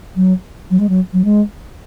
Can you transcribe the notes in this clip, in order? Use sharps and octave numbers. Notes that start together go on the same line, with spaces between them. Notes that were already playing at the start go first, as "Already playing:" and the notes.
F#3
F#3
G#3
F#3
F#3
G#3